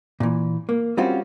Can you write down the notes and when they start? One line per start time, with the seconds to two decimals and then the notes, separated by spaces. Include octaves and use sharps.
0.20 A#2 E3
0.69 A#3
0.97 G3 C4 C#4 F4 F#4